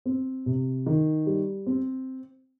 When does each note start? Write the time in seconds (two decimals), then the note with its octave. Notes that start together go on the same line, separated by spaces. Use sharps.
0.06 C4
0.46 C3
0.86 D#3
1.26 G3
1.66 C4